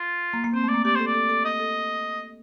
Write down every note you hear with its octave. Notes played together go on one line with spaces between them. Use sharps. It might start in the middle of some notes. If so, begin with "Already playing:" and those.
Already playing: F4
A#3
A#3
C4 C5
A3
D5
A#3
G4 D5
A4 C5
D5
A4
A4
D#5
A4